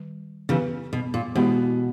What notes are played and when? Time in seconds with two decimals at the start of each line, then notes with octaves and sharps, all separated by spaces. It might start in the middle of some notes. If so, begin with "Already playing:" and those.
Already playing: D#3 G3
0.49 C#3 E3 B3 G4 B4
0.93 B2
1.14 A#2
1.35 B2 E3 G#3 B3 E4 G4